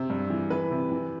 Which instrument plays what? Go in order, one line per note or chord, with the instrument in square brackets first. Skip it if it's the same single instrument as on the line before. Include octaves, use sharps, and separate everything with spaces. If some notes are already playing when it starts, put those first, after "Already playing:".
Already playing: [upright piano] C3 C5
G2
E3
E3 B4
C3
E3